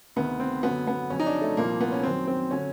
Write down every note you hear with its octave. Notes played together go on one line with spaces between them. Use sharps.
D2 C3 D#3 B3
C4
F#2 D3 F#3 B3
B3
F2 C#3 F#3 C#4
D#4
D4
A3
C2 A#2 F3 A#3
B3
C#4
F#2 D#3 F#3 C4
C4
D3 F#3 C#4